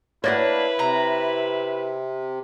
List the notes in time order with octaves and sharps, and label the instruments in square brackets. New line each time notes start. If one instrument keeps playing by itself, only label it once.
[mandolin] A#3 D4 [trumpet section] E4 B4 [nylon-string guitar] C#5 F#5
[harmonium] C3 [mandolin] A#5